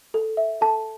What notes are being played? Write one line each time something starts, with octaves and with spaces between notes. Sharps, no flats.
A4
E5
A4 A5